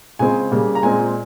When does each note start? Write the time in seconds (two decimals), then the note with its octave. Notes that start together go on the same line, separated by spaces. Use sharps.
0.19 C#3 G#3 C4 G#5
0.52 C#3 G3 A#3
0.75 A#5
0.83 A#2 G#3 C4 G#5